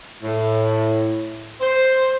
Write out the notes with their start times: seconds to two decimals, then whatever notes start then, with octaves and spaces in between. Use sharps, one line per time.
0.23 A2
1.61 C5